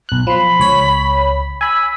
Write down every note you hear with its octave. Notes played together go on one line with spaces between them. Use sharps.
B1 F#6
F3 B5 C6
C#2 C#5 B6
G#5 B5 E6